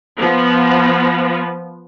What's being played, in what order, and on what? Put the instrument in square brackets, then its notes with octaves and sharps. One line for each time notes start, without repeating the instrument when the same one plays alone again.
[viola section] F3 B3